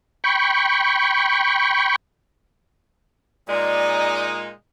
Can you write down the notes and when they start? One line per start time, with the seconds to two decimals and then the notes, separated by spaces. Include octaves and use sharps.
0.24 G5 B5 C#6
3.49 A#2 G#3 D#4 D5